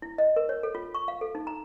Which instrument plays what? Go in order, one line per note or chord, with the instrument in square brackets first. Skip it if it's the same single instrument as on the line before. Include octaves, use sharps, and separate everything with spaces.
[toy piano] E4
D#5
A#4
C#5
A4
F4
C#6
F5
A4
D#4
A#5